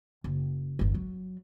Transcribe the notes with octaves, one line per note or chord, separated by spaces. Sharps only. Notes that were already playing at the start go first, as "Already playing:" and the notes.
F#1
G1 E2
F#3